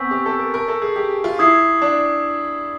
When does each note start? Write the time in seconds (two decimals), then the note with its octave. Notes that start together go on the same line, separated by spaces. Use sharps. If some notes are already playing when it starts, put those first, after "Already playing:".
Already playing: B3 C4 G#5 C#6 E6 G6 B6
0.11 G4
0.26 A4
0.39 A#4
0.54 A#4
0.68 A4
0.82 G#4
0.96 G4
1.24 F4
1.39 E4 D#6 G#6 C7
1.82 D4